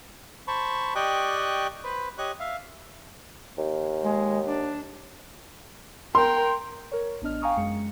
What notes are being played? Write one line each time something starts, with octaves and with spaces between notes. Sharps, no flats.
C5 A5 B5 C#6
G4 D5 D#5 G5 C#6 F#6
B4 C5 B5
G4 C#5 D#5 C#6 F#6
E5 F5
D#2
G#3
D4
A#4 G5 C6
A#4 C#5
A1 B3 D4 D#5 F6
F5 G5 G#5 A#5 C#6 D#6
F#2 G#3 C#7